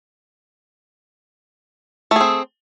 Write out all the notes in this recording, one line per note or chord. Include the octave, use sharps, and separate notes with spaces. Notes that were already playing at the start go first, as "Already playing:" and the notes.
A3 C4 G#4